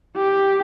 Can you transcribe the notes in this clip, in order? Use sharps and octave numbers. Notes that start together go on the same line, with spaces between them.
G4